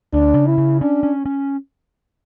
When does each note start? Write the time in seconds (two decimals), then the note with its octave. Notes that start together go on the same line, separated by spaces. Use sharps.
0.13 D2 D4
0.35 C#3
0.47 E4
0.58 C#3
0.81 C#4 D4
1.03 C#4
1.26 C#4